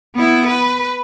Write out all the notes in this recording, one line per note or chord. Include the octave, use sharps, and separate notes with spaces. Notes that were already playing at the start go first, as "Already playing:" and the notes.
B3 E4
B4